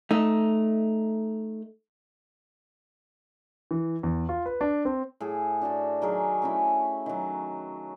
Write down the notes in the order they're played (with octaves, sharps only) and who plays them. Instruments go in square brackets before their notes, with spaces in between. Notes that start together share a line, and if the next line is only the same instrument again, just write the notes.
[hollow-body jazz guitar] A3 D#4
[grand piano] E3
E2
F4
B4
D4
C4
[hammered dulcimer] A2 G#4 A4
D4 F#4 G5 A5
D#3 F#3 G#4 A#4
A3 C#4 E4
D#3 F#3